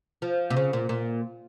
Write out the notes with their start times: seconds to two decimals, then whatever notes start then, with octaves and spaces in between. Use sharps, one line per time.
0.22 F3
0.50 C3
0.57 C#3
0.73 A#2
0.89 A#2